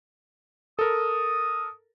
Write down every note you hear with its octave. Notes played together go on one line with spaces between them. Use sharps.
A4 A#4 D#6